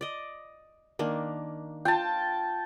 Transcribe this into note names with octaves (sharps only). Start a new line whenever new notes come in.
D5 D#5
D#3 A#3 D4
F4 G5 A5